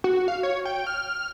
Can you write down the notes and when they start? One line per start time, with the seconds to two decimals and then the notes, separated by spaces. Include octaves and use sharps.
0.04 F#4
0.28 F5
0.43 C#5
0.65 G5
0.87 F6